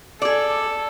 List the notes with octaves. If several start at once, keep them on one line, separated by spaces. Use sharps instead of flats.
G#4 A4 D5